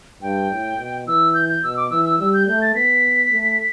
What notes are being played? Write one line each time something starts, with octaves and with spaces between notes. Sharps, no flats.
G2 G5
A2
B2
E3 E6
G6
G6
B2 E6
D6
E3 E6
E6
G3 E6
G6
A3 G6
A6
B3 B6
A3